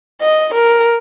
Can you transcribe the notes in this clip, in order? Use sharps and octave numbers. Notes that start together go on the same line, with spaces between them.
D#5
A#4